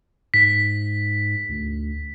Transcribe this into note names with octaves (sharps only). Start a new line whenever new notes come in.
G#2 B6
D2